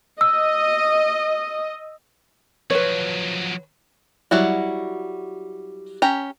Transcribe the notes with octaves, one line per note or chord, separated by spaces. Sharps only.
D#5 E6
F3 F#3 B4 C#5
F#3 G3 E4 F#4
C#4 G4 A#5